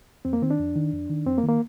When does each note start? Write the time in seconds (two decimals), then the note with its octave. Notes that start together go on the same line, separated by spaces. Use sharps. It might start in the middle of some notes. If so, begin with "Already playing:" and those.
0.25 F2 C4
0.33 A#3
0.42 D#3 C4
0.50 D4
0.59 F2
0.76 D#3
0.92 F2
1.10 D#3
1.26 F2 C4
1.38 A#3
1.43 D#3
1.49 A#3